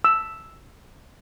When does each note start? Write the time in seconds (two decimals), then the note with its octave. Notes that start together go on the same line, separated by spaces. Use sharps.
0.04 E6